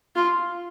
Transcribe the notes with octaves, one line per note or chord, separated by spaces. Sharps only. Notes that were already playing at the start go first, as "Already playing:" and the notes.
F4